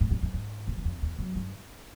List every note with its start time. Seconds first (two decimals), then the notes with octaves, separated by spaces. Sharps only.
0.01 A2
0.11 G#2
0.23 G2
0.34 G#2
0.67 F#2
0.77 E2
0.85 F2
1.02 E2
1.19 F#2
1.36 G2